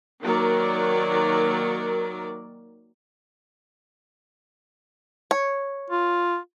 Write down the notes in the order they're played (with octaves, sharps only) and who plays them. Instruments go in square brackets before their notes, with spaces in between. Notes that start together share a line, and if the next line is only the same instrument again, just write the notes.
[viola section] D#3 F#3 A#3 A#4 D5
[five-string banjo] C#5
[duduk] F4